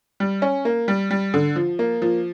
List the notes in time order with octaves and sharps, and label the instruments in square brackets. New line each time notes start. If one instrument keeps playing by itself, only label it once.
[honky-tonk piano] G3
C#4
A#3
G3
G3
D3
F3
A#3
F3